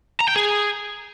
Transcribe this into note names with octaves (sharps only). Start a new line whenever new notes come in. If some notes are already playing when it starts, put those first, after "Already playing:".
A#5
G5
G#4